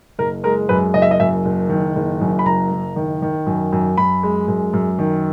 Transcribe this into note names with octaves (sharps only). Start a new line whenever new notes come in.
F#1 A#4
G#3 A#4
F#2 B4
F#1 D#5
E5
D#5
F#2 E5
F#1
D#3
F#1
F#2
B5
F#1 A#5
F#1
D#3
D#3
F#2
F#2
F#2 B5
G#3
F#2
F#2
D#3